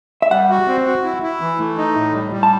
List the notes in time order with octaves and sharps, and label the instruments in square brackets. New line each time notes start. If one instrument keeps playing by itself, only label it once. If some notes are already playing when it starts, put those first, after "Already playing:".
[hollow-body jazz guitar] E5
[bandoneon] G3 [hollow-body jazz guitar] F#5
[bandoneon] F#4
C4
F#4
E4
E4
E3
A3
D#4
A2
G3
G3
[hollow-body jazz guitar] A5